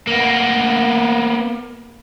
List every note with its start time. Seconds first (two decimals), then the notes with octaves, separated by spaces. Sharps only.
0.07 A#3 B3